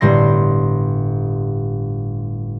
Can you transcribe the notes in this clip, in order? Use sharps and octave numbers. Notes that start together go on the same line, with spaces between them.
G1 A2 G3 C6 A#6